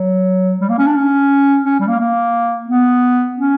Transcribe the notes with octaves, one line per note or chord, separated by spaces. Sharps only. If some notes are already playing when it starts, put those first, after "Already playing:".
Already playing: F#3
G3
A#3
C#4
D4
C#4
C#4
G3
A#3
A#3
B3
C#4